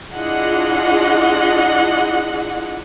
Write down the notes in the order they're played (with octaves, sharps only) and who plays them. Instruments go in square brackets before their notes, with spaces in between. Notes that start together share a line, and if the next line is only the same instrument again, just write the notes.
[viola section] D4 E4 F4 G#4 D#5 F#5